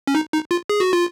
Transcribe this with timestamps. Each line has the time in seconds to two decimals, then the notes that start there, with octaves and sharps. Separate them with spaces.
0.07 C#4
0.15 D#4
0.33 D#4
0.51 F4
0.70 G#4
0.80 F#4
0.93 F4